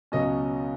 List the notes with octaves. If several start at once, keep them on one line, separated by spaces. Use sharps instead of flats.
C#2 B2 F#3 C#4 D#5